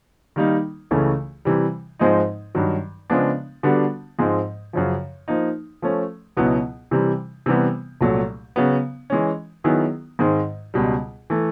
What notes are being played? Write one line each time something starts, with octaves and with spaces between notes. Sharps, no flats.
D#3 G3 A#3 D#4
C#2 C#3 E3 A3 C#4
C3 E3 G3
G#2 F3 G#3 C4 D#4
G2 D#3 F#3
C#3 F3 G#3 B3 D4
D3 G3 B3 D4 F#4
G#2 F3 G#3 C4
F#2 C#3 F3
F3 A#3 D#4
F3 A3 C#4
C#2 B2 F#3 B3 E4
C3 E3 G3
C3 E3 G3 B3
C2 A#2 F#3 A3
C#3 F#3 B3
E3 G#3 C#4
D#3 F#3 B3 E4 G#4
G#2 D#3 G#3 C4
C#2 B2 G3
E3 A3